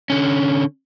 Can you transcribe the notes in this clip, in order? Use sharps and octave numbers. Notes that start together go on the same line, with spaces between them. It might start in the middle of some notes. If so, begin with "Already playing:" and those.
D3 C#4